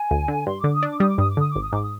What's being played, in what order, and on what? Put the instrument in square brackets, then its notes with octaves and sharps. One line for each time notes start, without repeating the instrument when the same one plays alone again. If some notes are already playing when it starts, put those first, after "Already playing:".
Already playing: [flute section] G#5
[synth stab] D2
D3
[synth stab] G2 [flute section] C6
[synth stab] D3 [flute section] D6
[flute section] D#6
[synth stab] D4 [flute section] D6
[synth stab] G3 [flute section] D#6
[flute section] D6
[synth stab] G2 [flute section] D#6
[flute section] D6
[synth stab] D3 [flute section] D#6
[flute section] D6
[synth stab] G#1
[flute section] D#6
[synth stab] G#2 [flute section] D6
[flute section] D#6